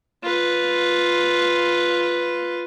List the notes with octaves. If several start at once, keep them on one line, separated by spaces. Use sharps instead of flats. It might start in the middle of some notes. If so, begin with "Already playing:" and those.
F4 B4